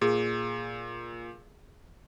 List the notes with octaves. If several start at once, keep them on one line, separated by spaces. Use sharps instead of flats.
A#2 G#4